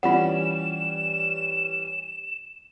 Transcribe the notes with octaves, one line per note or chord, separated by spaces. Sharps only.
E3 G3 C#4 F4 F#5 E7